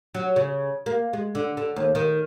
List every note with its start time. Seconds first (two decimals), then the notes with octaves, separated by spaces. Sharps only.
0.15 F#3
0.36 C#3
0.86 A#3
1.13 G#3
1.35 D3
1.57 D3
1.76 D#2
1.95 D#3